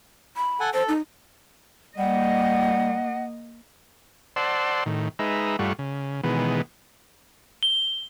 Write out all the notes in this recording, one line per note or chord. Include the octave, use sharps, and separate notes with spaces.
B5
A4 F#5 G#5
A4 C5
D#4
G3 A#3 D#5 F#5
C5 D5 F#5 A5 C6 E6
A2 D#3
G#3 D#4 B4 E5 A#5
G2 G3 A3 F4 F#5 C#6
C#3
B2 D#3 E3 G#3 B3
G7